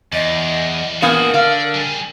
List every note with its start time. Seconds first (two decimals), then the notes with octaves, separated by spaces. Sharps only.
0.13 E2 E3 D5 D#5
1.02 A#2 B3 F#4 G#4 A#4 F5
1.34 D3 D5 F5
1.74 G3 G#4